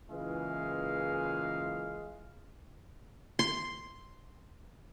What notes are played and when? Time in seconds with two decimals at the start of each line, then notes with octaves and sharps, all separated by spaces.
0.10 A#2 C#3 E3 G#3 G#4 F5
3.39 C6